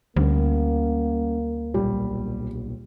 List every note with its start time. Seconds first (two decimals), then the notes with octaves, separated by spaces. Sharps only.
0.16 D2 G3 G#3 A#3 C#4
1.74 B1 A#2 G3